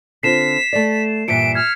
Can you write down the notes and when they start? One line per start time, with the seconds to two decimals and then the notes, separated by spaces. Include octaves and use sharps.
0.23 D3 C4 F4 B6 C7 E7
0.73 A3 D5
1.28 G2 A#2 E3 B6 C#7 D7
1.55 F6 G#6